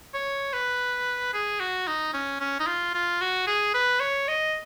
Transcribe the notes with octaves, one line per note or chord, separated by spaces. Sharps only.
C#5
B4
G#4
F#4
D#4
C#4
C#4
D#4
F4
F4
F#4
G#4
B4
C#5
D#5